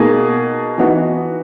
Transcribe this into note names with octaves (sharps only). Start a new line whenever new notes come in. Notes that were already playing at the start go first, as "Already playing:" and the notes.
Already playing: B2 A#3 D#4 G#4 D#5
E3 B3 D#4 F#4